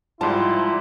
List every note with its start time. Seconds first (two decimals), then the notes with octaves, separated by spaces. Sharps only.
0.21 G#2 F3 G3 E4 A5 C6